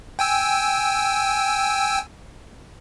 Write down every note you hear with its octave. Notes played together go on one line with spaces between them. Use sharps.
G5 G#5 E6